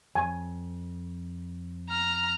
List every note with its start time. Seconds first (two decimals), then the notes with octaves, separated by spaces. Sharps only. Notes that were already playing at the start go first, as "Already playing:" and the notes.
0.15 F2 G#5
1.89 A#5 F6